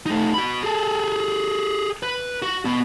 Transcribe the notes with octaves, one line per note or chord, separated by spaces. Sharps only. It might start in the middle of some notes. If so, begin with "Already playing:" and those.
A3 D#4
F#4 B5
G#4 A4
B4
F#4
B3 F#4